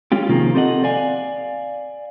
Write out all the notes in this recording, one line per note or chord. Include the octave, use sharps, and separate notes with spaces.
G#3 C#4 F4 G4
C3 D#3 F3 A#3 F4 G#4
C4 G4 A4 B4 D#5 F#5
D5 F5 G#5